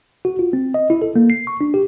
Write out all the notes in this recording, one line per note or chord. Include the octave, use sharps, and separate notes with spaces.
F#4
F4
C4
D#5
E4
A4
A#3
C7
C#6
D4
G4